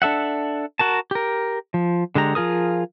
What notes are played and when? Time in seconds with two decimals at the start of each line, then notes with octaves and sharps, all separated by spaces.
0.02 D4 A4 E5 F#5
0.79 F#4 A#4 A5
1.11 G4 A#4
1.74 F3
2.15 D3 G#3 G4 A#5
2.35 F3 F4 G#4 A#4 D#6